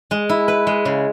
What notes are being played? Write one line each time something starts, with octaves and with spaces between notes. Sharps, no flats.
G#3
E4
B4
G#3
C#3